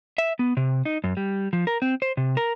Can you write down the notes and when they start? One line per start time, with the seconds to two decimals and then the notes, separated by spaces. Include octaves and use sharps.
0.18 E5
0.39 B3
0.57 C3
0.85 D#4
1.04 F#2
1.17 G3
1.53 F3
1.67 A#4
1.82 C4
2.02 C5
2.17 C3
2.37 A#4